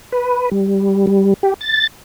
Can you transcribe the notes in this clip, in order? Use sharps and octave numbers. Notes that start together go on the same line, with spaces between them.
B4
G3
G3
G4
A6